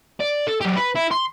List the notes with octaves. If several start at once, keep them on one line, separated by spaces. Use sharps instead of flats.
D5
A4
F#3 G4
B4
E4
C6